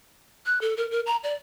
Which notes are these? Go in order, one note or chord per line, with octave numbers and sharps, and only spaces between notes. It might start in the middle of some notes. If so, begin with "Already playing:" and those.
F#6
A4
A#4
A#4
A#5
D5